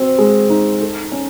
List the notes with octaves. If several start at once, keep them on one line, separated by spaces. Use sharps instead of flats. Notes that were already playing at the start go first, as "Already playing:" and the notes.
Already playing: C4 F#4
G#3
D#4
A4
C#4